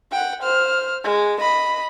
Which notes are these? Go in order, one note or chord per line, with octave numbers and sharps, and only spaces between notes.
F#5 G5
C5 F6
G#3
D#5 B5